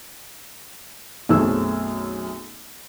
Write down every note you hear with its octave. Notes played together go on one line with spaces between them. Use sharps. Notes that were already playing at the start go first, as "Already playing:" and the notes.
B1 F#2 A3 C4 G#4 E6